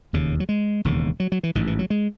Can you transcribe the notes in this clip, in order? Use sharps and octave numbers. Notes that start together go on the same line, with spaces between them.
E1 D#2 C#3
F#3
G#3
E1 D#2 C#3
F#3
F#3
E3
A1 G#2 D#3
E3
F#3
G#3